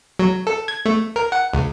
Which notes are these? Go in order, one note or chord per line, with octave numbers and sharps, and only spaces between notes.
F#3
A4
G#6
A3
A#4
F#5
C#2